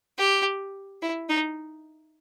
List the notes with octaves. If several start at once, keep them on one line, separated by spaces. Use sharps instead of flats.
G4
E4
D#4